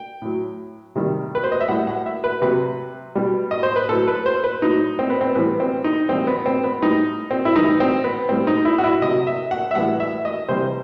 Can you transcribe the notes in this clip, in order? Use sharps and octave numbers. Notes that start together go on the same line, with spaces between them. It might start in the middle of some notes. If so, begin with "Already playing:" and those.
Already playing: G5
A2 F#3
C3 D#3 G3
B4
C5
D#5
E5
A2 G3 F#5
F#5
E5
B4
C3 F#3 B4
B2 G3
D#5
C5
B4
A2 F#3 A4
B4
C5
B4
A2 F#3 D#4
C4
B3
C4
A2 E3 G3 B3
C4
D#4
A2 E3 G3 C4
B3
C4
B3
A2 G3 D#4
C4
E4
A2 E3 G3 D#4
C4
B3
A2 G3 C4
D#4
E4
F#4
E4
C3 F#3 D#5
E5
F#5
E5
A2 E3 G3 F#5
E5
D#5
C3 E3 G3 C5